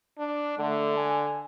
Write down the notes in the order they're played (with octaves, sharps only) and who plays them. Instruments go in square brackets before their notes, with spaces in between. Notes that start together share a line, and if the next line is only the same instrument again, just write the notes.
[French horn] D4
[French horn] D3 [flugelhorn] A3
[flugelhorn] G#5